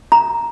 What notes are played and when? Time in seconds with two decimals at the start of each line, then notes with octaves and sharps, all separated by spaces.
0.12 A#5